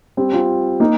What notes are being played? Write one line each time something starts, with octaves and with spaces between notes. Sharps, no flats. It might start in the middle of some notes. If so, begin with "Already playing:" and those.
G3 C4
C4 F4
A#3 D#4